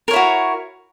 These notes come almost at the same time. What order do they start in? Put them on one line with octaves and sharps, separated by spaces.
A#4 C#5 E4 F#4